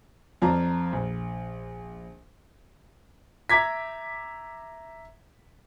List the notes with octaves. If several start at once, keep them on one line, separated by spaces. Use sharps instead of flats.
F2 F4 D5 A5 A#5
A#1
E5 A#5 D6 G#6 B6